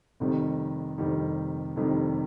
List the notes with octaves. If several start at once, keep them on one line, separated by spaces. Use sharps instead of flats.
F1 F2 D#3 G3
F1 F2 D#3 G3
F1 F2 D#3 G3